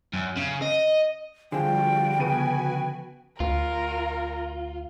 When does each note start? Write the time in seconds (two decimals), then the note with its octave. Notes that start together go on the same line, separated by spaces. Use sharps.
0.13 F#2
0.36 C#3
0.62 D#5
1.52 D3 F3 G3 F4 F#4 G#4 G5
2.19 C#3 B3 F#4 B4 G#5 D#7
3.40 D2 F4 A#4